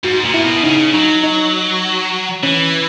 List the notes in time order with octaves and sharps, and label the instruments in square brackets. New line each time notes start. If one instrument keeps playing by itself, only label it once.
[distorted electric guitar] G#2 [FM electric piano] F#4
[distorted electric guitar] A#2
[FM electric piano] E4
[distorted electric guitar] B2
[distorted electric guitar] C#3 [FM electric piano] D#4
[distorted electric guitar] F#3 [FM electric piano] D#4
[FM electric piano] D#4
[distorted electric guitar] E3 [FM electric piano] C#4